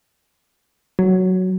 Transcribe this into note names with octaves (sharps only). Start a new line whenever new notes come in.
F#3